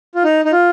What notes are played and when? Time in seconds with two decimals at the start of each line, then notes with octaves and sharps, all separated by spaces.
0.15 F4
0.24 D#4
0.45 D#4
0.52 F4